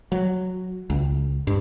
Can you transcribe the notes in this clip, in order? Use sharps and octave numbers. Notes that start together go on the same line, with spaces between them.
F#3
C#2
G2